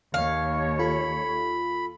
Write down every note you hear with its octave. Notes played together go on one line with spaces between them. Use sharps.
D#2 C#5 F5
F4 A4 B5